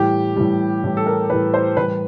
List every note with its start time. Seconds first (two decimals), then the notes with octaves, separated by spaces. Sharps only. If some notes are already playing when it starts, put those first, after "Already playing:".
Already playing: A2 E3 G3 G4
0.36 A2 E3 G3
0.84 A2 E3 G3
0.97 A4
1.07 A#4
1.30 A2 E3 G3 B4
1.54 C5
1.77 A2 E3 G3 B4